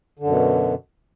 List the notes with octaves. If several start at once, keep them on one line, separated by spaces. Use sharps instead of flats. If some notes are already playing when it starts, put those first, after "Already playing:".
F#2 B2 D3